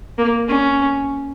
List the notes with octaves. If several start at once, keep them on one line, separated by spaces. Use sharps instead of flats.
A#3
C#4